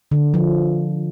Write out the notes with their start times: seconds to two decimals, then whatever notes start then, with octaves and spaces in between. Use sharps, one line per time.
0.11 D3
0.34 F3